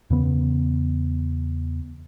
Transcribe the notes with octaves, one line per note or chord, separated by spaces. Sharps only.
E2 C#3 B3